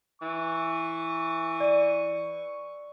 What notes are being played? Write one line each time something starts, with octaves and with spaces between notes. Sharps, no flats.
E3 C#6
D5 D#7